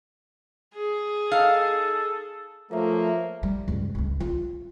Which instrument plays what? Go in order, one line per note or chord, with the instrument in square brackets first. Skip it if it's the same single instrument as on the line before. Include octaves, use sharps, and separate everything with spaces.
[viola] G#4
[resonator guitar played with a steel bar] D#4 F5 [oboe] A4
[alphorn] F3 [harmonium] A3 [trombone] A#3 [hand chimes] A4 C#5 E5
[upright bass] G3
C#2 G2
E1 C#2
F4